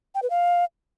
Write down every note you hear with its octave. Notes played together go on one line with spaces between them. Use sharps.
G5
B4
F5